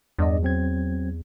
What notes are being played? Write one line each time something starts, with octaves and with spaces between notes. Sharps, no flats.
E2 G2 D5 D#5
F#3 C4 G#6